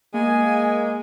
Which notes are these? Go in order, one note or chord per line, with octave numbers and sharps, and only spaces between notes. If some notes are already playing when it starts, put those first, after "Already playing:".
G#3 A#3 G#5